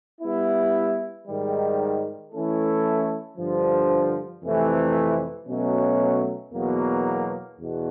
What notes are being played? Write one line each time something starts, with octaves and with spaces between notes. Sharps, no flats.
G3 B3 E4
G#2 D#3 G3
E3 A3 C#4 E4 A4
G2 D3 F3
F2 C3 E3 A3
B2 F#3 A3 C#4
E2 B2 F#3 A#3
E2 B2